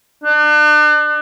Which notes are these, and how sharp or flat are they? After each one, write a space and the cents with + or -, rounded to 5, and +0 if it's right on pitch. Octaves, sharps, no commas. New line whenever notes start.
D4 +40